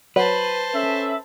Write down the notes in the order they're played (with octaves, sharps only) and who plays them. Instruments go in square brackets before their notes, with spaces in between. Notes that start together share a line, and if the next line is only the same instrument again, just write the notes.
[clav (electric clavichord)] F#3 [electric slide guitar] B4 [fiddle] C5 A5
[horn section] C#4 A4 E5